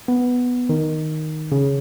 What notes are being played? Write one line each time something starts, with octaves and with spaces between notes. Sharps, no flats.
B3
D#3
C#3